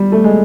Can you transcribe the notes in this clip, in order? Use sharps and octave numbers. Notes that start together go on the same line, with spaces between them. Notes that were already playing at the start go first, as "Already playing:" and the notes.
Already playing: G3
A3
G#3